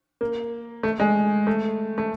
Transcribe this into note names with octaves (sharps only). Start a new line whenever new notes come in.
A#3
A3
G#3
A3
A3